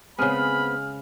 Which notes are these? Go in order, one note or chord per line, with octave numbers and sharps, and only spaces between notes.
C#3 G#3 B3 C4 B5 F6